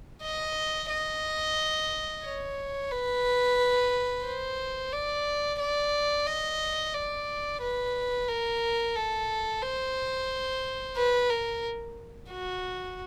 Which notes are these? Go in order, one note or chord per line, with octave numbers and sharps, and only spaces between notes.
D#5
D#5
C#5
B4
C5
D5
D5
D#5
D5
B4
A#4
A4
C5
B4
A#4
F#4